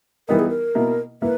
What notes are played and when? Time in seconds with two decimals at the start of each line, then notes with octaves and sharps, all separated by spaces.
0.28 E3 G3 B3 D#4 A#4
0.39 G#4
0.49 A#4
0.75 B2 A#3 E4
1.22 A#3 E4 B4